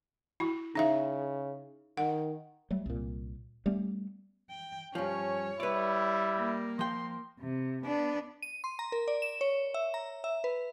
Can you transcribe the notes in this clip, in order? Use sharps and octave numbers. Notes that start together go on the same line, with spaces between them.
E4 F#4
C#3 D#4 E5 F5
D#3 F#5
F#3 G3 A3
C2 A#2
G3 A3 B3 C#4
G5
G2 F3 C#4 C#5
G3 E4 B4 D5
A#3
F3 G5 C6
C3
B3 D4
D#7
C6
A#5
A#4
D5
E7
C#5
E5
A#5
E5
B4